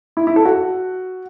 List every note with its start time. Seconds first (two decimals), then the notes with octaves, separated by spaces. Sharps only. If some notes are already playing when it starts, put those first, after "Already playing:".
0.17 E4
0.27 E4
0.36 A4
0.45 F#4